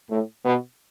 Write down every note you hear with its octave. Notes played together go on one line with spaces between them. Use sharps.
A2
B2